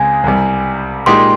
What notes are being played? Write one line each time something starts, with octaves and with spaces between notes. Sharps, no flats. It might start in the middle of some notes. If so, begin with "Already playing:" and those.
Already playing: C#2 C#3 G#3 C4 G#5
C2 C3 G3
A#2 G#3 D#4 G4 C6